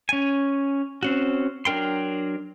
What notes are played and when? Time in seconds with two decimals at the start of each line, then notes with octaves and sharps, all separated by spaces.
0.09 C#4 G#5
1.03 C4 C#4 F#4
1.65 F#3 D4 A#4 G5 C6